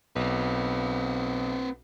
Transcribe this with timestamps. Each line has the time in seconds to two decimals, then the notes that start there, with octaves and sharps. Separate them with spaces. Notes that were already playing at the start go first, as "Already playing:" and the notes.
0.16 B1 C4 B4